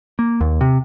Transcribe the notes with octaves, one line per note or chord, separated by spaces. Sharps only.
A#3
D#2
C3